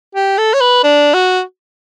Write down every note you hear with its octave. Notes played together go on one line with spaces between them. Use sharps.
G4
A4
C#5
B4
D4
F#4